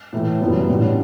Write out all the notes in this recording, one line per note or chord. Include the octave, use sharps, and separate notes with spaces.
A2 E3 A3
F#1 F#2 E3 G3 B3
A1 A2 G3 D4